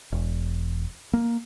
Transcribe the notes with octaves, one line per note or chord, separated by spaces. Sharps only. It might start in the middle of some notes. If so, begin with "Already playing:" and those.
E1
A#3